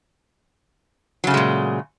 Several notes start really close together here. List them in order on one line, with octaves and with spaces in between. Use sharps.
F#3 C#3 A3 G#3 A#2